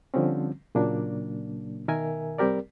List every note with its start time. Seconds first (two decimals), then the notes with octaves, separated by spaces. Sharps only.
0.14 D3 F3 G3 C4 C#4
0.75 A#2 C#3 F#3 A#3 D4
1.88 B2 D#3 A#4 E5 G#5
2.38 C2 G3 C4 G4 A#4 D5